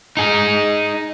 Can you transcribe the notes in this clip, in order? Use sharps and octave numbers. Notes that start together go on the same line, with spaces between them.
D#4 G#4